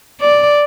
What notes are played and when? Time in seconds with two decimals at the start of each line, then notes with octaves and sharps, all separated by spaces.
0.21 D5